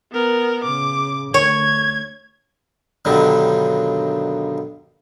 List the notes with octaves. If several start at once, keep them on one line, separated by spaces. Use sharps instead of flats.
B3 A#4
C#3 D6
D2 C#5 G#6
G2 B2 D3 D#3 F#3